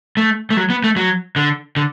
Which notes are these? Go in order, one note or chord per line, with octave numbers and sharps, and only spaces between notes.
A3
A3
F#3
B3
A3
F#3
D3
D3